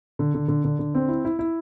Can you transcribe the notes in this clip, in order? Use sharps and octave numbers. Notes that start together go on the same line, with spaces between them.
D3
D3
D3
D3
D3
C4
E4
E4
E4